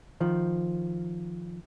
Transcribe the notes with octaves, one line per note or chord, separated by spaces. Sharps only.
D#3 F3